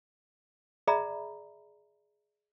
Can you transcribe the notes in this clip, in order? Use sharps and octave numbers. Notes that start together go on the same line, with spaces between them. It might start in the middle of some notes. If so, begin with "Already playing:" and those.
G#4 D5 E5 A#5 B5